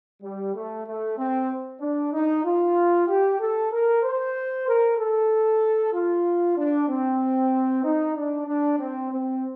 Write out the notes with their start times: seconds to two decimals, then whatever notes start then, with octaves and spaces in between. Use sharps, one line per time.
0.22 G3
0.54 A3
0.86 A3
1.18 C4
1.80 D4
2.13 D#4
2.44 F4
3.07 G4
3.40 A4
3.72 A#4
4.03 C5
4.67 A#4
4.98 A4
5.93 F4
6.57 D4
6.88 C4
7.83 D#4
8.15 D4
8.47 D4
8.79 C4
9.11 C4